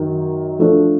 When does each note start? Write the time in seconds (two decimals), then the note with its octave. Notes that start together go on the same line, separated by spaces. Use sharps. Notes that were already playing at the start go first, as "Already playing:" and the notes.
Already playing: F#2 D#3 F#3
0.59 F3 A3 D4